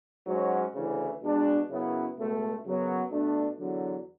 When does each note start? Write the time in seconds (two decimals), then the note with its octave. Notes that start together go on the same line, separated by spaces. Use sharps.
0.26 G#2 F#3 C#4 F#4
0.74 D2 C#3 E3
1.21 B2 G#3 D4
1.69 F#2 C#3 F#3 B3 E4
2.17 C#2 B2 A3
2.65 F#2 C#3 F#3 B3
3.11 B2 A3 D4
3.59 E2 D3 F#3